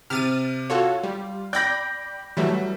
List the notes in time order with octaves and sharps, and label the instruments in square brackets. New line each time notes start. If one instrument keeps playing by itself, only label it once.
[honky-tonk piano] C3 [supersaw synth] F6 A6 D#7
[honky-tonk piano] F4 [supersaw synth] F#4 A4 C#5
[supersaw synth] G3
[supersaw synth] D5 G5 B5 [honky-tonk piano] G6 A#6
[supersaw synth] E3 F#3 A3 [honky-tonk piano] G3